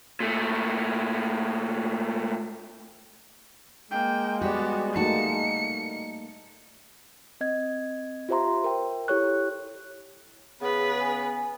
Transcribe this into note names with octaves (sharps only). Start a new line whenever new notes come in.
A#2 A3
G#3 A#3 G5
G3 B3 F#4 G4 D5
A3 A#3 D#4 F#4 A5 C#7
C4 D#5 G#6
F4 G4 C5 E5 A#5 C6
A#4 G5
E4 G4 A4 C#5 C#6 F#6
C#3 B3 G#4 B4
G#5